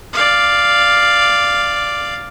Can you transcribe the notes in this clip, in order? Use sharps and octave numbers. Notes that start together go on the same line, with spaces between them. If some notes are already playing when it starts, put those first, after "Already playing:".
D5 F5